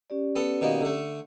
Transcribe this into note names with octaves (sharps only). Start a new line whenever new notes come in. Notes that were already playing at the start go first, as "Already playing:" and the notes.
C#4 G4 D5
B3 A4
B2 D#3 A#3
D3 A3